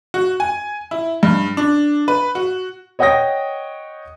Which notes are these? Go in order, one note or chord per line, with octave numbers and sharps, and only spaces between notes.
F#4
G#5
E4
G2
D4
B4
F#4
C#5 D#5 F#5 G5 D#6 A#6